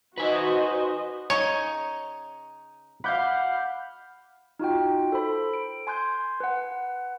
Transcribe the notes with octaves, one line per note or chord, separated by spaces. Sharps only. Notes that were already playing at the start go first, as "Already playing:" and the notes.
D#4 F#4 B4 C5 D#5 G#5
C#3 D#4 C#5
F5 F#5 B5 D6 G6
D#4 F4 F#4 G5
A4 C5 B5
D7
G#5 C6 F#6 G6
B4 F#5